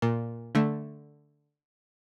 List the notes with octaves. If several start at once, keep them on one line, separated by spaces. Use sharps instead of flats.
A#2
D3 A3